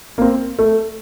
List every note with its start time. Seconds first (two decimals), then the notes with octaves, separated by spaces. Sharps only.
0.18 A#3
0.22 C4
0.59 A3